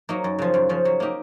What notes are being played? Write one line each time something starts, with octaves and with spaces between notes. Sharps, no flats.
F#3 A#3 D#4
F#2
C#3 F3
F#2
C#3 F3
F#3
A#3 D#4 G4